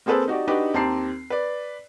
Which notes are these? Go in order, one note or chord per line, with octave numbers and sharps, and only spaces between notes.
A#3 C4 G#4 A4 B4 C5
D#4 F#4 G4 D5
D4 D#4 F#4 G4 B4
D#2 C4 G4 A5 A#5 C7
B4 D5